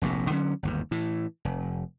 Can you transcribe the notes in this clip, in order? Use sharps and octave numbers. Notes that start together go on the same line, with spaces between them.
F1 A#1 A2 C3
D3 F#3 C#4
G1 D#2 G#2
A2 E3
F1